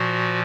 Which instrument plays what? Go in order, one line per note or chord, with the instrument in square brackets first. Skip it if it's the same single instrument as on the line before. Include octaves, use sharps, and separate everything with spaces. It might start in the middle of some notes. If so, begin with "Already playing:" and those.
Already playing: [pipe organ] A#2 F3 F#4